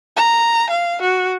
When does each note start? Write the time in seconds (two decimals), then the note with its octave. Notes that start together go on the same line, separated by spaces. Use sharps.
0.17 A#5
0.70 F5
1.02 F#4